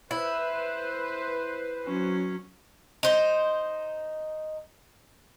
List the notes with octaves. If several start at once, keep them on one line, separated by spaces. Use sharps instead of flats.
E4 B4 C5
F#3 C#4
D#4 C5